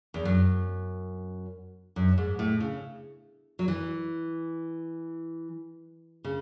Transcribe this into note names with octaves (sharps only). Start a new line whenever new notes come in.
E2
F#2
F#2
G#2
A2
C#3
F#3
E3
C#3